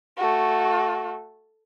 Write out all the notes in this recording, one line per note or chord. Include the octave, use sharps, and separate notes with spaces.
A3 F#4